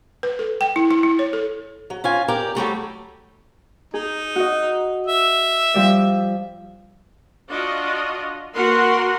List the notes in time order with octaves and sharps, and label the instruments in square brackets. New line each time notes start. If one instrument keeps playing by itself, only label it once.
[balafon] B4
A4
G5
E4
E4
E4
C#5
A4
[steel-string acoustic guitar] F#3
C#4 F4 G#5
G4 A#4 D5 G5
F#3 G3 A3 G4
[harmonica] D#4 [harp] G#4
[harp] F#4 D#5
[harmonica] E5
[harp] F3 G3 D5
[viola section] D4 F4 F#4 D#5
A#3 F#4 A#4 B4 F#5 C6